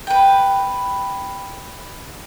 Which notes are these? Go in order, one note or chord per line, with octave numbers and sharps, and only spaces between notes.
B4 G5